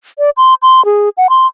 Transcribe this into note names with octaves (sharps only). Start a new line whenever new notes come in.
D5
C6
C6
G#4
F#5
C6